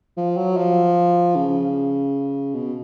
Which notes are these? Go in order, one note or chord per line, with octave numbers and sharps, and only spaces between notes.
F3
F#3
F3
C#3
B2